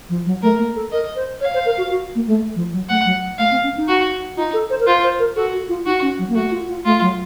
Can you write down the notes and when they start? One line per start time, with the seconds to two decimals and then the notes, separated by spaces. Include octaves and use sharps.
0.09 F3
0.26 F#3
0.42 A3 A#4
0.58 A#3
0.76 A4
0.92 A#4 D#5
1.16 C5
1.41 C#5 F5
1.54 C5
1.66 A#4
1.78 F#4
1.91 F#4
2.15 A#3
2.28 A3
2.56 F3
2.73 F#3
2.89 A3 F#5
3.05 F#3
3.39 A3 F5
3.51 C4
3.64 C#4
3.76 D#4
3.88 F#4
4.37 D#4 F4
4.54 A4
4.70 C5
4.80 A#4
4.87 F4 C5
5.04 C5
5.19 A#4
5.36 F#4 A4
5.53 F#4
5.69 F4
5.86 D#4 F#4
6.02 C#4
6.19 F#3
6.29 A#3
6.35 A3 F#4
6.51 F4
6.68 F4
6.85 A3 F4
7.01 F#3